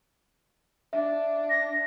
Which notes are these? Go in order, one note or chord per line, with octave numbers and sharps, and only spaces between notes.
D4 E5
A#6